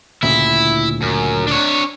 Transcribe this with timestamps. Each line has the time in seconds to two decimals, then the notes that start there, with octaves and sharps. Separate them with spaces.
0.23 D2 A#2 C#3 E4
1.02 F#2
1.47 D4 C#5